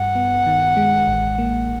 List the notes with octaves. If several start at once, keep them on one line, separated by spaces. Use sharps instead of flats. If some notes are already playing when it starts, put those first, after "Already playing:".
Already playing: G2 F#5
B3
D#3
G#3
A1
A#3